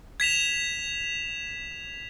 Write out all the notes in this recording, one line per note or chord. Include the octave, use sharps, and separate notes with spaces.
G#6 B6 E7 F7